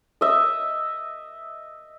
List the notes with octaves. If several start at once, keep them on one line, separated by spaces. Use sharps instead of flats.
D#5 E5